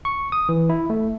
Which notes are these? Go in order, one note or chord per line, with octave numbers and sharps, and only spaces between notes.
C#6
D#6
E3
E4
A3